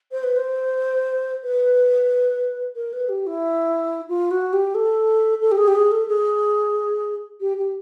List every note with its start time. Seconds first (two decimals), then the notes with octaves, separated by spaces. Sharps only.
0.12 C5
0.23 B4
0.36 C5
1.43 B4
2.75 A#4
2.93 B4
3.09 G4
3.26 E4
4.09 F4
4.31 F#4
4.53 G4
4.74 A4
5.41 A4
5.51 G4
5.57 G#4
5.67 G4
5.75 G#4
5.91 A4
6.08 G#4
7.41 G4
7.57 G4